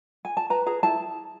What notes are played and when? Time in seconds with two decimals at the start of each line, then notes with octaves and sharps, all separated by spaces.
0.25 G#5
0.37 A5
0.50 B4 A#5
0.66 G#4 A#5
0.83 E4 A5